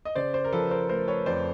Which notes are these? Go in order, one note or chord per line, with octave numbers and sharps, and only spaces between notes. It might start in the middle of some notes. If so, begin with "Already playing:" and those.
D#5
C#3 C5 D5
C5 D5
A#4
F3 A4 B4
A#4 C5
A3 A#4 C5
B4 C#5
F2 C5 D5